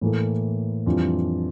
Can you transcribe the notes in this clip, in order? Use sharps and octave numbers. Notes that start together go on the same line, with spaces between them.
A2 E3 A#3 E4 A4
F2 E3 G3 D4 F4